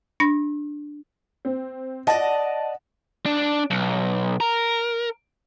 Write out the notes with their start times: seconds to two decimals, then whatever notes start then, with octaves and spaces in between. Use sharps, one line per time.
0.20 D4 B5 A#6
1.45 C4
2.07 D5 D#5 F#5 A5 A#6
3.26 D4
3.70 B1
4.40 A#4